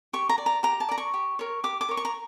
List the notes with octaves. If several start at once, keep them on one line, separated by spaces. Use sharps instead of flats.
G4 C#6
A#5
D5
A#5
G4 A#5
A5
D5 A#5
C#6
G4
A#4 C#5
G4 D6
D6
A#4 C#5
C#6
A#5